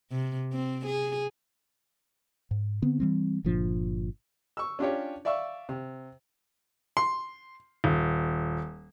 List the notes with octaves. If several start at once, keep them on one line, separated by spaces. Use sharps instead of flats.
C3
C4
G#4
G#2
D3 B3 C4
E3 G3 C4
G1 A#2 F3 D4
C#6 E6
C#4 D4 F4 G4 C#5
D5 E5 F5 C#6 E6
C3
C6
D#1